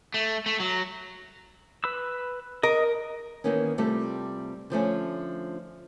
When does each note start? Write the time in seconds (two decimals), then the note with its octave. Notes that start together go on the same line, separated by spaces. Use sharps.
0.14 A3
0.46 A3
0.60 F#3
1.84 B4 B5 E6
2.63 A#4 D#5
3.44 D#3 E3 A#3 B3 C#4
3.78 C3 G3 A3 F4 A4
4.70 D3 F3 A3 C#4